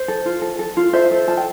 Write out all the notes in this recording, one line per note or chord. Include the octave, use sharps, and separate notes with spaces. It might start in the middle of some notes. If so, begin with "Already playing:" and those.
Already playing: C5
A4
F4
A4
A4
F4
A4 C5 E5
A4
F4 A5
G5